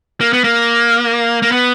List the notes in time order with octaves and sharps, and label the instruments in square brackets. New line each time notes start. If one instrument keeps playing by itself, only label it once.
[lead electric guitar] A#3
B3
A#3
A#3
B3